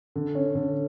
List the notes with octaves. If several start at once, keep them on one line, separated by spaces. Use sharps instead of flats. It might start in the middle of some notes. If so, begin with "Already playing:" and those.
D3
C#4
D3